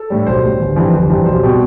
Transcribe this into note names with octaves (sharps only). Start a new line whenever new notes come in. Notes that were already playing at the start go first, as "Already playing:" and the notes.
Already playing: A4
A2 G3
B1 C5
A2 G3
G1
F2 C3 E3 G3
G1
F2 C3 E3 G3
B1 C5
B2 G3 C4